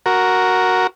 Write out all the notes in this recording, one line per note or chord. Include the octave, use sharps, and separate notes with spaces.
F#4 A#4